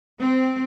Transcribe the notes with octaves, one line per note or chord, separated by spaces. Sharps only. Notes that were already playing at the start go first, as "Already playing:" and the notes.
C4